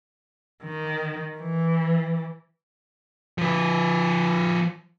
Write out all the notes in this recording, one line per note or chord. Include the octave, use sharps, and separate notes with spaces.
D#3
E3
F3 B4